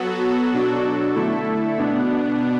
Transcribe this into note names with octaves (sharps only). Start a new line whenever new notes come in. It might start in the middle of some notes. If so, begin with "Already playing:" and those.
Already playing: F#3 B3 F#4 A4
B2 F#3 D4 F#4 A4
D3 A3 E4 A4
B2 B3 D4